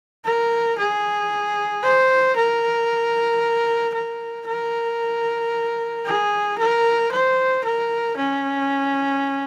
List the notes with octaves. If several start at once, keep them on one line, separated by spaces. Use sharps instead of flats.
A#4
G#4
C5
A#4
A#4
A#4
G#4
A#4
C5
A#4
C#4